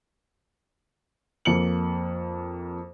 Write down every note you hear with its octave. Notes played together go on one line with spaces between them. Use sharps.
F2 A#3 C#7 F#7